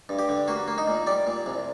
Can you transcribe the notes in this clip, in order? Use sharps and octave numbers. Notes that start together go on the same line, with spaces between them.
G2
G4
D3
A#3 F#4
A#3
D#4
A#2
G3 D5
A#2
C2